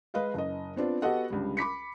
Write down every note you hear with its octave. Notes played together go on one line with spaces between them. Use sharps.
G#3 B4 D#5 F5
F#1 D#5
B3 C4 D4 F4
B3 F#4 G4 A4 D#5 F#5
C#2 D3 G3
B5 D6 B6 C#7